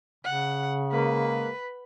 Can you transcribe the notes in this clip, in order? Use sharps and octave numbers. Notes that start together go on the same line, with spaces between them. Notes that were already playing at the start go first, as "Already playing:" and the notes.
C#3 F#5
G#3 A#3 B4